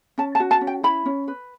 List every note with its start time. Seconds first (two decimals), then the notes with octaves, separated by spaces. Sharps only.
0.18 C#4 A5
0.35 A5
0.40 F#4
0.51 A5
0.61 C#4
0.67 G5
0.83 E4 B5
1.06 C#4
1.28 B4